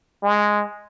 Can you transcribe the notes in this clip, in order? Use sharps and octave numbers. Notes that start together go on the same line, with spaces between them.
G#3